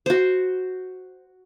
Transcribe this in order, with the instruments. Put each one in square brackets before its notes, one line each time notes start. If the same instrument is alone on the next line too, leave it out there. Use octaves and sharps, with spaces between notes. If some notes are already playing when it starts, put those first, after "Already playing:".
[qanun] F#4 C5